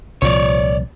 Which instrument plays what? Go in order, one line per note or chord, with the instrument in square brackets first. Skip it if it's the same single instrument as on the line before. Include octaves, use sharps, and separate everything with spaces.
[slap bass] C2 A#2 F3 [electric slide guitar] C#5 D5